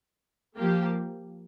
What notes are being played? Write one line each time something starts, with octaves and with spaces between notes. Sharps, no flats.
F3 A#3 G4